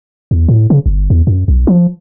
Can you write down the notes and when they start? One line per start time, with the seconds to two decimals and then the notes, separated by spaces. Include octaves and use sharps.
0.31 E2
0.48 A2
0.70 C#3
0.86 G1
1.10 E2
1.27 F#2
1.48 B1
1.67 F3